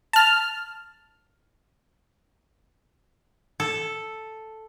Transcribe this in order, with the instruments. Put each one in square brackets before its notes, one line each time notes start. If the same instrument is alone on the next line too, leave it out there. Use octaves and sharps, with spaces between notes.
[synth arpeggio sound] A5 F6
[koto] A4